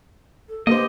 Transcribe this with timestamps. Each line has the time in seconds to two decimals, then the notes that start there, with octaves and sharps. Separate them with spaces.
0.49 A4
0.67 D3 A#3 B3 G4 C5 D#5